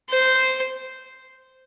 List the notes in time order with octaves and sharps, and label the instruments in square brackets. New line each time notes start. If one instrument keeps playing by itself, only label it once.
[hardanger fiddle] C5